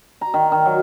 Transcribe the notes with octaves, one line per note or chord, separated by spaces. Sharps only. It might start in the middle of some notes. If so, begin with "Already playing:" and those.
A#5
D#3
D#3
F#3